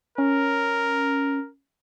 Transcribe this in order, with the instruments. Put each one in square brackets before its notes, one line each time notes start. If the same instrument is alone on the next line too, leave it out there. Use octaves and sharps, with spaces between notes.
[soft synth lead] C#4 [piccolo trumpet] A#4